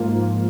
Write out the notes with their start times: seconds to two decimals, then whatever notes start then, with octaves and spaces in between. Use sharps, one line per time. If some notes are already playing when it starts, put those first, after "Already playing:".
Already playing: G#2 F3 A#3 F4